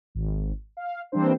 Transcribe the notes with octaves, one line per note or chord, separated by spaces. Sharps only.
G#1
F5
E3 G3 A#3 C4 D4 C5